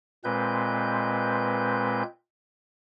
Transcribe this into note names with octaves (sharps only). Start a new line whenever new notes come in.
A#2 G#3 C4 B4 G6